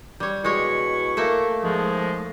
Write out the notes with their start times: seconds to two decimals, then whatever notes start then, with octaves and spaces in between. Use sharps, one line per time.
0.20 G3 C#5
0.44 B2 G#3 E4 C#5 C#6
1.17 A3 A#3 E5
1.63 G#2 F3 G#3